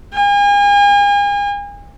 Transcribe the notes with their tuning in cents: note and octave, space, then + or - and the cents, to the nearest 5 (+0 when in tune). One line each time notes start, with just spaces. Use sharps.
G#5 -40